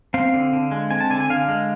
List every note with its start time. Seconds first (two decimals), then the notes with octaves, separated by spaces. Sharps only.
0.14 C4 F5
0.34 D3
0.53 D3
0.71 G#3
0.90 C4 G#5
1.00 A5
1.10 D3 G#5
1.20 G#5
1.30 D3 F5
1.49 G#3